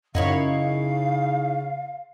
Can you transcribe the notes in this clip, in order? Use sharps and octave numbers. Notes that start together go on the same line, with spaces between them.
F#2 C#3 D#4 E4 C#5 F5